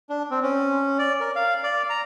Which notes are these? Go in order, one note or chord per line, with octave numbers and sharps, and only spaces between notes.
D4
C4
C#4
D5
A#4
F5
D5
A#5